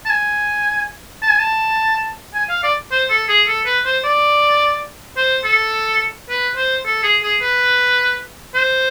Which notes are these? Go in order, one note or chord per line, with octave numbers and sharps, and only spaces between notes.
A5
G#5
A5
G#5
A5
G#5
F5
D5
C5
A4
G#4
A4
B4
C5
D5
C5
A4
B4
C5
A4
G#4
G#4
B4
C5